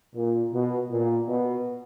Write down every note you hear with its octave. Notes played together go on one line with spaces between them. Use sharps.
A#2
B2
A#2
B2